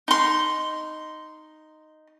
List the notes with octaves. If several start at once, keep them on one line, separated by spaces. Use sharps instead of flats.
D#4 C6